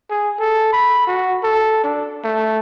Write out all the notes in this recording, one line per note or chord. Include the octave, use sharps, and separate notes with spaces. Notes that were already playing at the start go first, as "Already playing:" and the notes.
G#4
A4
B5
F#4
A4
D4
A3